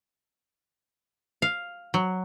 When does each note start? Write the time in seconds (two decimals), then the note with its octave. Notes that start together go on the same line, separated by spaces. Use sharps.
1.42 F5
1.94 F#3